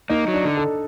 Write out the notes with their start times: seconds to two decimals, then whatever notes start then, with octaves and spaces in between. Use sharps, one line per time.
0.09 A#3 D#4
0.28 F#3
0.34 D4
0.45 D3
0.57 A4